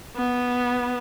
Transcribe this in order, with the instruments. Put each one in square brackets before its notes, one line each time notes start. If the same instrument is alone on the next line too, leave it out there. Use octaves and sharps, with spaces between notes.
[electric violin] B3